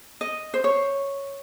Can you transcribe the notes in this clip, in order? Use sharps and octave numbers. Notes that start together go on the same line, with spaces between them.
D#5
C5
C#5